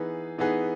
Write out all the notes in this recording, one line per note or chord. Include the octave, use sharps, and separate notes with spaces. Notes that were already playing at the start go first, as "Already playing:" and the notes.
Already playing: E3 B3 D#4 G#4 B4
E3 B3 D#4 G#4 B4